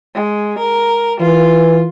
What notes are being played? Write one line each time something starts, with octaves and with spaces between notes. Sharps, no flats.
G#3
A#4
E3 F4